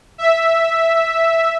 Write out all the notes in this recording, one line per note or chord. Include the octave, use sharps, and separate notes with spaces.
E5